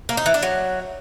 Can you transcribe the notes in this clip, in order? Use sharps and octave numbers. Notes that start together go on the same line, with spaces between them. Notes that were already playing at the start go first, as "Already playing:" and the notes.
A#3
D#4
E3
D4
F#3